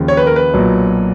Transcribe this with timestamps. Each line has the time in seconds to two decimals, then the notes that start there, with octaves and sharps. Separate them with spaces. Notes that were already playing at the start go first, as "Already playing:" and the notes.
Already playing: D#2 C#3 F3
0.08 C#5
0.17 B4
0.27 A#4
0.36 B4
0.54 B1 A#2 F#3